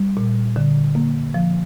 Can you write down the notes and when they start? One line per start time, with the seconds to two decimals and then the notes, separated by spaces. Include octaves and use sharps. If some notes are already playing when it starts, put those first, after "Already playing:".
Already playing: G3
0.17 A#2
0.56 D3
0.95 A#3
1.34 F3